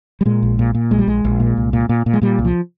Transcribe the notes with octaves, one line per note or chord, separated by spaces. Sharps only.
G3
A#2 G#3
A#1
A#2
A#2
A#1 G#3
G3
A#1 G#3
A#1
A#2
C2
A#2
A#2
A#2
G#3
A#2 G3
C2
F3